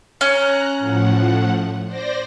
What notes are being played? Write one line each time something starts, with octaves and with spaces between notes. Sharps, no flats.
C#4 A#5 F#6
A2 F3 F#5
C5 D5 A#6